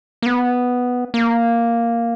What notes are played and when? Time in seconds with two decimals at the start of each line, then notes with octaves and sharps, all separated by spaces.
0.22 A#3
0.26 B3
1.14 A#3